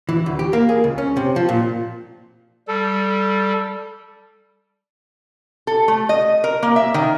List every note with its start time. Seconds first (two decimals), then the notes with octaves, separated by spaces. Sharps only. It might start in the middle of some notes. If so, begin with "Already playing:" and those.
0.09 E3
0.26 D2
0.39 G4
0.53 A#3
0.69 G#4
0.84 C#2
0.98 C#4
1.17 C3
1.36 F3
1.49 A#2
2.68 G3 A4
5.67 A4
5.88 A3
6.09 D#5
6.44 A#4
6.63 A#3
6.76 E5
6.94 D#3